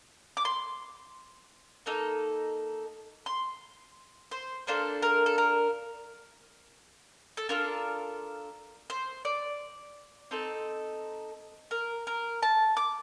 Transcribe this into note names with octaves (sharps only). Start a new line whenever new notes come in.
D6
C6
A#3 D#4 A4
C6
C5
A#3 D4 F4 A4 C5
A#4
A4
A#4
A4
D4 F4 A4 A#4
C5
D5
C4 D#4 A4 D#5
A#4
A#4
A5
D6